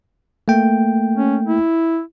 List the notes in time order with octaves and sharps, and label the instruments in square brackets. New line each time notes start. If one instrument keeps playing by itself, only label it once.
[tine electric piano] A3 A#3 G5
[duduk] C#4
E4